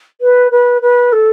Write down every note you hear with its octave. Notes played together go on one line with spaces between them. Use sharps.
B4
B4
B4
A4